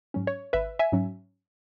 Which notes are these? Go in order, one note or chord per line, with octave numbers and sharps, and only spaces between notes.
G#2 F#3 C#4
C#5
G#1 B4 E5
E5 G#5
G#2 F#3 C#4